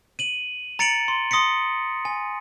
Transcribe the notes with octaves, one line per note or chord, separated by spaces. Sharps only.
D#7 F#7
A#5 A6 C#7 D7 F7 F#7
C6
C6 D#6 A#6 B6 C#7
G#5